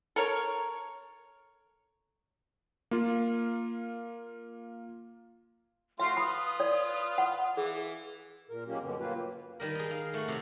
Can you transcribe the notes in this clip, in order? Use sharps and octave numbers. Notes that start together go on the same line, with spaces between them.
A4 A#4 C#5
A#3 F4
A3 F4 F#4 E5 C6
F4 B4 B5 D#6
D5
F#5
E3 G#4
A#2 A#4
F#3 G#3 A#3 C#4 G4
G2 B2 D3
F#3 A#3 F4 G4 B4
D#3 G3 A#4
D#4 G#4
F5
A3 F#4
C3 F#3